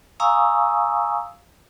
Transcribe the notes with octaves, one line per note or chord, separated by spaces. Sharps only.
F5 G#5 A#5 C#6 D#6 E6